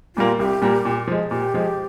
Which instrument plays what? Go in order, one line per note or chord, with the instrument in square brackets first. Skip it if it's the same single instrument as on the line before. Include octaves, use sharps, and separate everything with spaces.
[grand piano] A#2 G3 A#3 [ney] F4
[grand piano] C2 [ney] G4
[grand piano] A#2 G3 A#3
A#2
F3 G#3
[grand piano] A#2 [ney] G4
[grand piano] F3 G#3